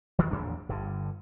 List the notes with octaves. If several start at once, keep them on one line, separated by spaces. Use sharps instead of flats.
E2 D#3
A1 E2 A#2 D4
G1 G2 D3